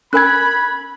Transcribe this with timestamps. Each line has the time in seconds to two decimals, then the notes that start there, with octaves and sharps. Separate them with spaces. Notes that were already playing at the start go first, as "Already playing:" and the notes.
0.13 C#4 A#4 G#5 B5 F#6 G#6